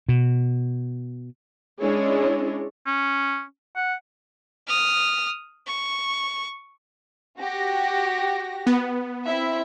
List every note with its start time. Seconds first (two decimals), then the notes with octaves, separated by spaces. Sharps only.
0.09 B2
1.80 G#3 C#4 D4 E4 G#4 C#5
2.86 C#4
3.76 F#5
4.67 D#6 F6
5.67 C#6
7.39 F#4 G4 A#6
8.67 B3
9.25 C4 E4 E5